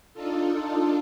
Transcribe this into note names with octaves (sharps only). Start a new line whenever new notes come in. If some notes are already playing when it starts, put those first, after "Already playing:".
D4 D#4 F4 A4